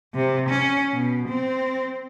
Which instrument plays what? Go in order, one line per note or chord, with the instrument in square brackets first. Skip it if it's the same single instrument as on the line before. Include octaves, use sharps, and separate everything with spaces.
[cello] C3
C#4
B2
C4